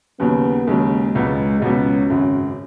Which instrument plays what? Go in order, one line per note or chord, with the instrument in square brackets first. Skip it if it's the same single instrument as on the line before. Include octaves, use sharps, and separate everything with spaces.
[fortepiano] D#2 C#3 F#3 [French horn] B3
[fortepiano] D#2 C#3 F#3 [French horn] G#3
[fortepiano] C#2 B2 F#3 B3
[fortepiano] C#2 B2 F#3 B3 [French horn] C#4
[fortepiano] G#1 F#2 C#3